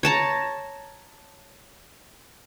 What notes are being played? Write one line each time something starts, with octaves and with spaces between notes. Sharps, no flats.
C#5 A5 A#5